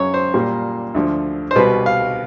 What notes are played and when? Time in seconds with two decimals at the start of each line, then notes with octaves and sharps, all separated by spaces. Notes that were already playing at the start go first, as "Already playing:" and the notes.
Already playing: F#2 C#3 F#3 C#5
0.14 C5
0.34 A#2 G3 A#3
0.94 D2 D3 F3
1.51 C5
1.55 C2 B2 G3 B4
1.86 F5